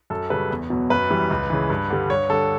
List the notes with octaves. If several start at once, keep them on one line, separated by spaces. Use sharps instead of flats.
F#2 A4
C#3 G3 B4
E2
B2 F#3
F#2 B4
E3 G3
C#2
C#3 E3
G2
D3 G3
G2 C#5
D3 G3 A4